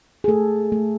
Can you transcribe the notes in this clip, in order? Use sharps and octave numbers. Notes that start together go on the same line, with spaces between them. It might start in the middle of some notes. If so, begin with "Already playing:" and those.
G#4
A3 A4
A3